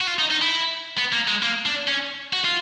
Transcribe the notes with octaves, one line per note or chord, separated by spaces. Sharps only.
F#4
F4
D#4
D#4
E4
B3
A#3
G#3
A#3
D4
C#4
F#4
F4